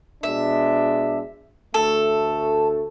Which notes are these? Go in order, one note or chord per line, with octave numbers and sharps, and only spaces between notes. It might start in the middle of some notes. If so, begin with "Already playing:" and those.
B2 G#3 D4 E5
D2 A3 A4